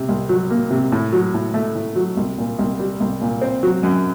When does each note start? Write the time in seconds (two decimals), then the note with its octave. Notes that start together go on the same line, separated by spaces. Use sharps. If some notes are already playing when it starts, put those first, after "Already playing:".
Already playing: C3
0.09 C2
0.29 F#3
0.50 A#3
0.71 C3
0.92 A2
1.12 F#3
1.34 A2
1.54 A3
1.75 A2
1.96 F#3
2.17 C2
2.38 A#2
2.59 C2
2.80 G3
3.00 C2
3.21 A#2
3.41 C4
3.63 F#3
3.83 F#2